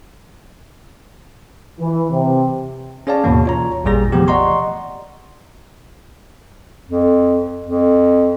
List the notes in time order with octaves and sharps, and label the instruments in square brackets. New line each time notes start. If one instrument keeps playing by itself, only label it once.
[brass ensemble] E3
C3
[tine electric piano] C#4 G#4 C#5 D5 F5 A5
D#2 G#2 B2 E3 A#3
F4 C#5 A#5
A1 E2 A#2 G3 G#4 A#6
C3 E3 F3 A3 B3 G4
D5 D#5 F#5 A#5 C6 C#6
[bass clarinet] F2
F2